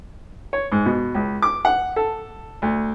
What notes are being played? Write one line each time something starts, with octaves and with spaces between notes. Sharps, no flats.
C#5
G#2
B2
C#2
D6
F#5
A4
D2